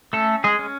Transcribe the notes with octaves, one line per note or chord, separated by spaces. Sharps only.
A3 C#4 A4
G#3 G#4
C#4